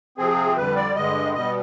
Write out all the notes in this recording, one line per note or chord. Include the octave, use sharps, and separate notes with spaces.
C3 F3 C4 G#4
F2 D3 G3 B4
D5
G2 D3 G#3 D#5
B2 G3 B3 D#5